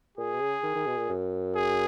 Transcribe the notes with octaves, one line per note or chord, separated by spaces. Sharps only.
A#2 G#4
B2
C#3
D#3
D#3
B2
A#2
F#2
G#4